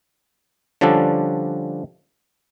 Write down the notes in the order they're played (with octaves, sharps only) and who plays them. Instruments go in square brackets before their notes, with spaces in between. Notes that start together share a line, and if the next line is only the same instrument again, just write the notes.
[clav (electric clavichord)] D3 F3 G3 C#4 D4 A4